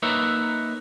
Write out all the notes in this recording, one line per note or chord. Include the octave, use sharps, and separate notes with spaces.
A#3 D#4 B4 C#5 E5